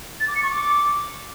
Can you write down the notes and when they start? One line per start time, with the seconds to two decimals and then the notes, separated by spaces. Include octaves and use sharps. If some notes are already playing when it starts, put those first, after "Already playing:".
0.20 A6
0.28 D6
0.35 C#7
0.43 C#6
0.50 D6